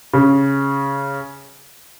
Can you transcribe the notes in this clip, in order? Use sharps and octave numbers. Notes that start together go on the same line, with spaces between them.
C#3